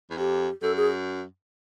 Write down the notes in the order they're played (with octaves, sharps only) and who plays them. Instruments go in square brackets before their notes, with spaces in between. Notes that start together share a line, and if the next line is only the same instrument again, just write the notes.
[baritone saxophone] E2
[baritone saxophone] F2 [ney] G4
[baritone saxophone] F#2 [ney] A4
[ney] G#4